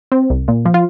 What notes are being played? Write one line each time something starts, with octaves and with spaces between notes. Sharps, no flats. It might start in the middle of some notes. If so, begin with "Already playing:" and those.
C4
C2
A#2
F3
F4